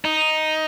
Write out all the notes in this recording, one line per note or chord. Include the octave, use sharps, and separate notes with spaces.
D#4